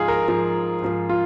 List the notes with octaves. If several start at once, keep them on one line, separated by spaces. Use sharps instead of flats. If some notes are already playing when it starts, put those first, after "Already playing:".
Already playing: G#2 F3 F4 G#4
A#4
G#2 F3
G#2 F3
F4